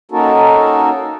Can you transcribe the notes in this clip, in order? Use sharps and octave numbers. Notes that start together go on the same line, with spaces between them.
A#3 C#4 D#4 F#4 A4 A#4